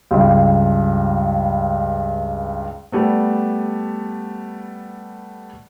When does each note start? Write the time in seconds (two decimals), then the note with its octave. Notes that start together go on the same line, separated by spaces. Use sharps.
0.11 C#2 G2
2.92 G3 A3 B3